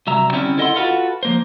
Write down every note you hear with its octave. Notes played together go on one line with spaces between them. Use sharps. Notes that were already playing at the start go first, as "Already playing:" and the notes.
C2 F#3 E5 A#5
D3 G3 C4 C#4 E4
E4 A4 D#5 E5 F#5 C6
F4 F#4 A4 B4 F5 F#5
F3 A#3 C5